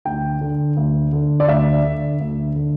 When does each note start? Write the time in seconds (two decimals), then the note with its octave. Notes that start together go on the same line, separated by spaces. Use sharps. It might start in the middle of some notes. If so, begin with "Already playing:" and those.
0.05 D2 G5
0.41 D3
0.77 D2
1.13 D3
1.40 D5
1.48 D2 E5
1.84 D3
2.20 D2
2.56 D3